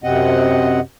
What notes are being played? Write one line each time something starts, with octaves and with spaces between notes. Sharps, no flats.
F#2 C3 C4 D#5 F#5